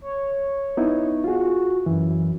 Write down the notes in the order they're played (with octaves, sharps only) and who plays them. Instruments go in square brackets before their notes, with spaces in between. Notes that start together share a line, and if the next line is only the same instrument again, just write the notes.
[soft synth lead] C#5
[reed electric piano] B3 D#4 E4
[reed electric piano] F4 G#4 [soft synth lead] F#4
[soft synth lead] F#2 [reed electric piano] E3